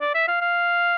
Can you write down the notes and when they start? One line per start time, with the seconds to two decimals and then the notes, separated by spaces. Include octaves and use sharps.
0.01 D5
0.14 E5
0.28 F5
0.41 F5